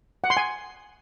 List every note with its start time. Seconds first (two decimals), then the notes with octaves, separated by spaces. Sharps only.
0.24 F#5
0.30 C6
0.37 G#5